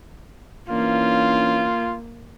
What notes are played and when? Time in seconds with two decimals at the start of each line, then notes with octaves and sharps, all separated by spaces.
0.69 E3 A#3 C#4 D4 F4